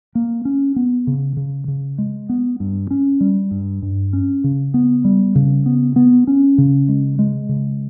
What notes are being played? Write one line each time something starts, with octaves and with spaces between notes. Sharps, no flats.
A#3
C#4
B3
C#3
C#3
C#3
G#3
B3
G2
C#4
G3
G2
G2
C#4
C#3
B3
G3
C#3
B3
B3
C#4
C#3
G#3
G#3
C#3